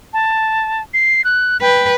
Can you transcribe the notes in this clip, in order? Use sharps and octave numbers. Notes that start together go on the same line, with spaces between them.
A5
C7
F#6
B4 G5